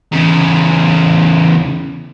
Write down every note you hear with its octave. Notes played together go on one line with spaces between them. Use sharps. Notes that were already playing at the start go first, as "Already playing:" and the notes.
E2 C#3